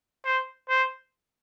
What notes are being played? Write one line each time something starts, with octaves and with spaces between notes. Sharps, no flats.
C5
C5